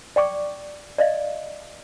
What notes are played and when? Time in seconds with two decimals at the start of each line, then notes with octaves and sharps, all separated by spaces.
0.16 D5 G5 C#6 D6
0.98 D5 D#5 F5